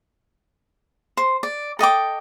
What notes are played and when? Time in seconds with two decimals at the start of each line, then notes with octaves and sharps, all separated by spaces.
1.17 C5
1.43 D5
1.79 A4 D#5 G5 D6